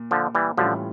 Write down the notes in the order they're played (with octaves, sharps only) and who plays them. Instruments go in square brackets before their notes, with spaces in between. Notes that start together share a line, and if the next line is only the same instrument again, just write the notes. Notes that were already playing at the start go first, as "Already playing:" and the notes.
Already playing: [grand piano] A#2
[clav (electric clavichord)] D3 F3
E3 G3
[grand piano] A2 E3 G3 C#4 F4 [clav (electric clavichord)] D3 F3